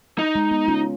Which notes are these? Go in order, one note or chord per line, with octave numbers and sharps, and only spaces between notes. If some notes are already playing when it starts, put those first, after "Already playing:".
D#4
G#3
G#3 B3
C#4 F4